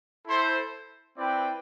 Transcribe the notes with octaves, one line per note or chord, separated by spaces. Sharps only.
E4 A4 C5
C4 E4 B4 D5 G5